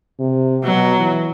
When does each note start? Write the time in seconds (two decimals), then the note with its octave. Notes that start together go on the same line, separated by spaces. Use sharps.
0.19 C3
0.64 B2 F#3
0.99 E3